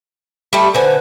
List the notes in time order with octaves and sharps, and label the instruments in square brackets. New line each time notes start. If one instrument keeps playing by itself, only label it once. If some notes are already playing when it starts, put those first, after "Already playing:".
[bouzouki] G3 A3
[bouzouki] D3 G#5 [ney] B4 [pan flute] C5